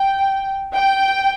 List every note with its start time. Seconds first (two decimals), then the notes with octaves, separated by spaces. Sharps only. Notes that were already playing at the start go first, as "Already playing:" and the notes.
Already playing: G5
0.75 G5